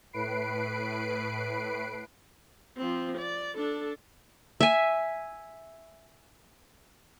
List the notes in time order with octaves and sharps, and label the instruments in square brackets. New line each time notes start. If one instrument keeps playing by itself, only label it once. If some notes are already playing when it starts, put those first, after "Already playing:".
[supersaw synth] A2 B4 C7 D7
[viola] F3 C4
D5
D4 A4
[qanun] E5 G#5